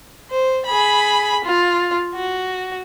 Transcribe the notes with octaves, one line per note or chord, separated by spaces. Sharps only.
C5
G#4 B5
F4
F#4